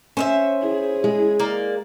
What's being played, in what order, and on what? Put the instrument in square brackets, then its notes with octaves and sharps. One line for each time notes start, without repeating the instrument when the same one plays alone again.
[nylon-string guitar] C#4 [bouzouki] C5 D#5 E5
[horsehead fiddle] E4 G#4
[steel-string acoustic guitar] G#3
[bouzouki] A#3 A#4 D5